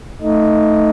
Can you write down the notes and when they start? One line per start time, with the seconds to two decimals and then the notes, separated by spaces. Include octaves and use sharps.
0.22 A3 D#4